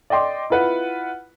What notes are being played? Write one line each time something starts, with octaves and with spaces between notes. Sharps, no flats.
D5 D#5 G5 C6 D6
E4 F4 B4 F#5